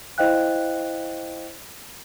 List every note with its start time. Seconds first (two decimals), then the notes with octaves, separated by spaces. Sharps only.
0.18 E4 C5 D#5 F5 G5 F#6